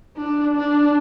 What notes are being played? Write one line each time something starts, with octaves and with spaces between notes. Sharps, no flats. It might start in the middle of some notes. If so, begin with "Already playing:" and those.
D4
D4